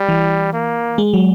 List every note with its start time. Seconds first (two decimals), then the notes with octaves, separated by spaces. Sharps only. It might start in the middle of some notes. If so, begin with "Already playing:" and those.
Already playing: G3
0.09 E3
0.53 A#3
0.98 G#3
1.13 F#3